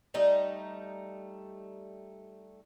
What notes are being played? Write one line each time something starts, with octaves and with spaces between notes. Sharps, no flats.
G3 A3 D#4